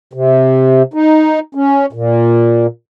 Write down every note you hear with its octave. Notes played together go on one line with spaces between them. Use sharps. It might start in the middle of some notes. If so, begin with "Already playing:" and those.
C3
D#4
C#4
A#2